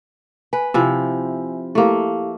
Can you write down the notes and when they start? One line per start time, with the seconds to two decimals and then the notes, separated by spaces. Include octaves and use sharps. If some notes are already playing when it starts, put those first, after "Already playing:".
0.53 B4 G#5
0.74 C3 F3 E4 G#5
1.75 A3 A#3 E4 G4 F5